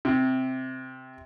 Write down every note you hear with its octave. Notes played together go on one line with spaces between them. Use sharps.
C3